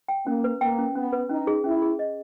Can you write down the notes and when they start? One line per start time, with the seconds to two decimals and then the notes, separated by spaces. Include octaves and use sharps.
0.08 G5
0.26 A#3 C#4
0.44 B4
0.60 A#3 G5
0.79 C#4
0.95 B3 C#4
1.13 B4
1.29 C#4 D#4
1.47 G#4
1.64 C#4 E4
1.82 G#4
1.99 D#5